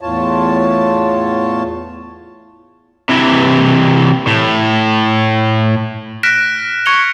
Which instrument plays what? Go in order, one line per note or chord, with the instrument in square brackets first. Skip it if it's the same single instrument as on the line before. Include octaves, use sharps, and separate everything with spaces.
[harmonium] E2 A2 F4 C#5 A5
[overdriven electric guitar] C3 E3
A2
[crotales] F6 F#6 A#6 B6 D7 E7
C#6 G#6 C#7 F7 G7